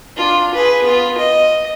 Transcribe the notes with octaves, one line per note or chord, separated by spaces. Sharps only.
D4 F4
G#4 B4
B3 F4
D#5